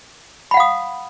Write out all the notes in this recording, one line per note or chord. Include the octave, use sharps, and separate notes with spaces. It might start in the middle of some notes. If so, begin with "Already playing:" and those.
F5 F#5 B5 D#6